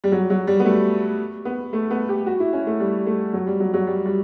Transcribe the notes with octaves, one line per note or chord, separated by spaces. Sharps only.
G3
F#3
F#3
G3
B3
A3
B3
A3
B3
G4
F#4
E4
C#4
A3
G3
A3
F#3
G3
F#3
F#3
G3
G3